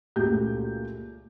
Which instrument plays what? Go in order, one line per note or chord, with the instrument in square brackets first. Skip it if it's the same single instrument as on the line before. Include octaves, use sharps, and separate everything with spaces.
[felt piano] C#2 A#2 A3 F#4 G4 G6